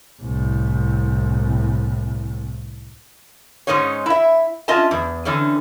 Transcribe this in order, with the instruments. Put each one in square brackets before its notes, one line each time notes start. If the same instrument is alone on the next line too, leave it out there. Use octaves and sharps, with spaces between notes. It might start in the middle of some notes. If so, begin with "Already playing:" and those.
[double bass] C2 A2
[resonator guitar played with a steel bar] G#2 G#3 C#4 D#4 C#5
E4 E5
C#4 F4 D#5 E5 A5
E2
D3 E3 C4 C#4